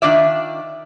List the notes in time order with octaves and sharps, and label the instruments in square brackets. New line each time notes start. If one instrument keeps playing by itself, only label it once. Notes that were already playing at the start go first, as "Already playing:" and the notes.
[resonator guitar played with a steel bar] D#3 D4 F4 D5 E5